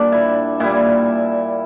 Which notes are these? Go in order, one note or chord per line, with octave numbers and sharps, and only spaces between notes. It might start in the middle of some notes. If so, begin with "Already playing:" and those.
Already playing: A#2 G3 D4
E4
A#2 G3 E4